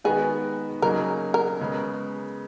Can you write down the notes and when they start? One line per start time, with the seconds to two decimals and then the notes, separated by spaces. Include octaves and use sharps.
0.04 D#3 G#3 B3 F#4 G#4 B4
0.82 C#3 F#3 A#3 D#4 G#4 A#4
1.34 A#4
1.61 C#3 G#3 B3